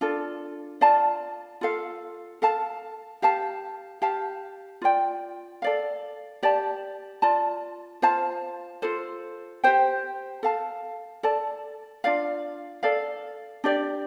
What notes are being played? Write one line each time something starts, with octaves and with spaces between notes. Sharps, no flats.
D4 F4 A4
F4 D5 F5 A5
F4 A4 F5
A4 F5 A5
G4 F5 A5
G4 F5 A5
F4 D5 G5
A4 D5 F5
G4 D5 A5
F4 D5 A5
F4 C5 F5 A5
F4 A4 C5
G4 C5 G5
A4 F5 A5
A4 D5 A5
D4 F4 D5 F5
A4 D5 F5
D4 G4 D5